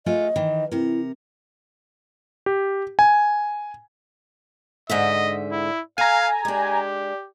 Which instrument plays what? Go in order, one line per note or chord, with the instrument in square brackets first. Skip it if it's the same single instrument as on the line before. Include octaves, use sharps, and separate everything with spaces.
[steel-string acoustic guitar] G#3 A3 F4 [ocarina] D#5
[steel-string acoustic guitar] D#3 E3
[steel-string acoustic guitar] C3 A#4 [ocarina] E4
[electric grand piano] G4
G#5
[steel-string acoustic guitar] G#2 D3 E5 [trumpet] D#5
[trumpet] E4
[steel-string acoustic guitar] A4 [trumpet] F5 [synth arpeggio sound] G#5 A#5
[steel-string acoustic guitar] G#3 D4 [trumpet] G4